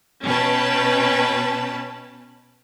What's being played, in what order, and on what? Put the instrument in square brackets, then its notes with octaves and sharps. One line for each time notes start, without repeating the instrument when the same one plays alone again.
[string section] B2 C#4 B4 G5 A5